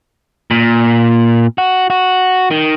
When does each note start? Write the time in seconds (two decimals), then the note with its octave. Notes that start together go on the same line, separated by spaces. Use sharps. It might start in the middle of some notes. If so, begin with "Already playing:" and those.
0.51 A#2
1.58 F#4
1.90 F#4
2.51 D#3